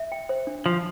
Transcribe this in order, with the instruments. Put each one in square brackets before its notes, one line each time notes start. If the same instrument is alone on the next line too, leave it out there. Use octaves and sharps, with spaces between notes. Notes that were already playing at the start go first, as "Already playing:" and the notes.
Already playing: [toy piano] E5
G5
C5
D4
[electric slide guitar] F3 [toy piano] F5